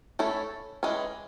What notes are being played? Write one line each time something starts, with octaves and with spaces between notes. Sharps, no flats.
A3 C#4 E4 A4
E3 G#3 C#4